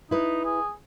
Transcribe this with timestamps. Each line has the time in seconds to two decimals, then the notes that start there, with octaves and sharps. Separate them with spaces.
0.11 D#4 E4 B4
0.45 G#4